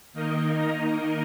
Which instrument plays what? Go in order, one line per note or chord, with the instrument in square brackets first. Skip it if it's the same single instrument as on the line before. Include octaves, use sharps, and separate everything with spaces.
[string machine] D#3 A#3 D#4 A#4 D#5